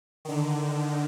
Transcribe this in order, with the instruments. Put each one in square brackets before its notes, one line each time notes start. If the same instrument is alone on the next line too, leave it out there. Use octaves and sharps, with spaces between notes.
[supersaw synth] D3 D#3